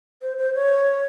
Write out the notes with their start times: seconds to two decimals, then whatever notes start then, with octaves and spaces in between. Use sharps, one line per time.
0.22 C5
0.38 C5
0.55 C#5